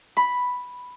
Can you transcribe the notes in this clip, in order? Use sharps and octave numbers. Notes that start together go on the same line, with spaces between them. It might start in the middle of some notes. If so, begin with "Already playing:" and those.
B5